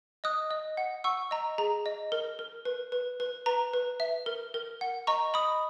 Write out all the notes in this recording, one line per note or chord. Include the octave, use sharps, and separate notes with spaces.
D#5 D#6 F#6
D#5
F#5
F#5 C#6 E6
D#5 A#5
G#4 A#5
D#5
A#4
A#4
B4
B4
B4
B4 A#5
B4
E5
A#4
A#4
F#5
D#5 A#5 C#6
D#5 B5 D#6